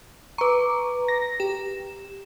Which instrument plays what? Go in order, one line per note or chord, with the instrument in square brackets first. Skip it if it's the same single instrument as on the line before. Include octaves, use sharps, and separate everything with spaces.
[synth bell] B4 A#5 [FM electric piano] C#6 D6
[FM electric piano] A#6
[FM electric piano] G4 [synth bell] E7